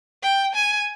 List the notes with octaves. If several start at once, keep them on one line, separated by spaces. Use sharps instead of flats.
G5
G#5